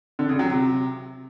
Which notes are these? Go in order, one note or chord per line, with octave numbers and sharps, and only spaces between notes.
D3
C#3
F#3
C3